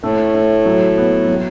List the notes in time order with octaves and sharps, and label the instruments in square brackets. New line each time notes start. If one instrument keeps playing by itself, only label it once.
[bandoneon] A2 [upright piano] A3
[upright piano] A3
F#3
B3
F#3